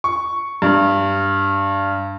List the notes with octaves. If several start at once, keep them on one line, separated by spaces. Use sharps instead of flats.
C#6
G2